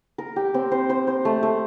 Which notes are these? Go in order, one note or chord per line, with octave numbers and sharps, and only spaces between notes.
A#4
G4
C4
C5
C5
C5
A3
A3